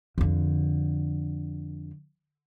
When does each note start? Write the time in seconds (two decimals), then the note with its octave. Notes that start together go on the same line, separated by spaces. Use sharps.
0.18 F2 D3